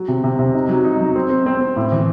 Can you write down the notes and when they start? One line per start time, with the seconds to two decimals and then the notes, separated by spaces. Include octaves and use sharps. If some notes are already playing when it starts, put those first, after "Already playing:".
Already playing: F#3
0.08 C3
0.24 C3
0.39 C3
0.54 D#4
0.69 F#3
0.84 D#4
1.01 F#3
1.15 C4
1.30 C4
1.46 C4
1.61 C4
1.76 A2
1.92 E3